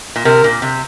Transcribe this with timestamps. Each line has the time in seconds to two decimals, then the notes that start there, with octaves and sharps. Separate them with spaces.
0.16 A#2
0.25 C3 A#4
0.44 A#2
0.62 C3